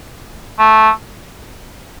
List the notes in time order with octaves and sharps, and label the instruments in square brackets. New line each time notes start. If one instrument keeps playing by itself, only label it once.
[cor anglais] A3